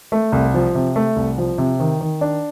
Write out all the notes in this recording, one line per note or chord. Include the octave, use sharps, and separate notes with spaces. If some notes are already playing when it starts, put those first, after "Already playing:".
A3
C2
F3
C3
A3
C2
F3
C3
D#3
D#3
D4